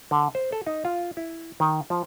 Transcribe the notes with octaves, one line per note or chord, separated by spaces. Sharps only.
D3
C5
A4
D#4
F4
E4
D#3
F3